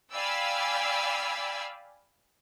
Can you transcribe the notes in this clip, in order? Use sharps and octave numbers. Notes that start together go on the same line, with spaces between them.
D5 F5 G5 G#5 B5 E6